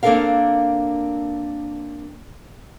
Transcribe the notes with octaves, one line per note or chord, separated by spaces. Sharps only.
A#3 C4 D4 A4 A#4 F5